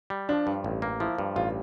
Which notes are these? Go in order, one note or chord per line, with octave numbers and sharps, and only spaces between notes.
G3
F3 D4
G2
A1
A#3
F3 E4
G2
A1 F4